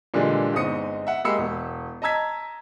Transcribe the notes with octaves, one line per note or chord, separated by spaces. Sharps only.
A#2 D3 E3 G3 G#3
G1 G#3 C4 D#4 D#6 C#7
E5 F#5
G#3 A#3 G4 B5 E6 C#7
E1
D#5 A5 A#5 E6 G#6 B6